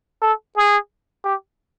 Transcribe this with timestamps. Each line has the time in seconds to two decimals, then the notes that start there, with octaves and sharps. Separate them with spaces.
0.22 A4
0.57 G#4
1.24 G4